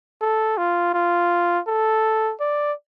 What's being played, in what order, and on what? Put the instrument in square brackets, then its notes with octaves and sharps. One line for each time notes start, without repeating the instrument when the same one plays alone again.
[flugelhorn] A4
F4
F4
A4
D5